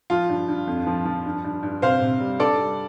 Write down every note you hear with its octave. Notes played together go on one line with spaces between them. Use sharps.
F3 F4
G2
G2
F2
F3
F3
G2
G2
G2
C3 C5 F5
C3
G3
G2 A4 D5
G3